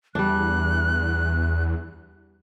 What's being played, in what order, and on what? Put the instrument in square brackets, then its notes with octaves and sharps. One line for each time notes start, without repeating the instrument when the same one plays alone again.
[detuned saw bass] E2 [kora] G3 D4 [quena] F#6